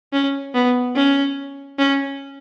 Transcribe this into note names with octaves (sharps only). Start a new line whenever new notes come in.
C#4
B3
C#4
C#4